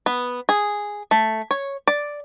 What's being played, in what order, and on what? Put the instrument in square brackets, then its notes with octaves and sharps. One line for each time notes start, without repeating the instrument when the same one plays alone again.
[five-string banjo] B3
G#4
A3
C#5
D5